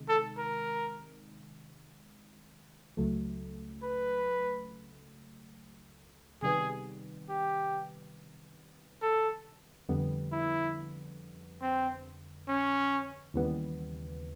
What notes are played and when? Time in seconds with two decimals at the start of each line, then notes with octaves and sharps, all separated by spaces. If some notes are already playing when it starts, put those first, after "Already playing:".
Already playing: C3 D#3 G#3
0.08 A4
0.38 A#4
2.97 C#2 C#3 F#3 A3
3.83 B4
6.42 C3 D#3 G3 B3 G#4
7.29 G4
9.02 A4
9.89 F2 D3 G3 B3
10.32 E4
11.62 C4
12.48 C#4
13.34 D#2 C#3 E3 G3 B3